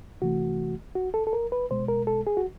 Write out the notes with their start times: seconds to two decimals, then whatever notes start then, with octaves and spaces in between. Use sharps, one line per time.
0.22 C2 C3 E3 A3 F#4
0.95 F#4
1.14 A4
1.27 A4
1.33 A#4
1.52 B4
1.70 C2 B2 G#3 C5
1.88 A#4
2.07 A4
2.27 G#4
2.37 F#4